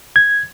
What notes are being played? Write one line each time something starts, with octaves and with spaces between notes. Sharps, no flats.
G#6